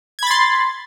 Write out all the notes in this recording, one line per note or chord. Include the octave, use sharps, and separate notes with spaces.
B5 C6 G#6 A6